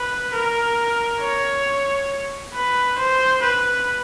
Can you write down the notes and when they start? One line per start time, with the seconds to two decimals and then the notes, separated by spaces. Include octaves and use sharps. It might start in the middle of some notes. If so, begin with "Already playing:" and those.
Already playing: B4
0.34 A#4
1.21 C#5
2.55 B4
2.98 C5
3.43 B4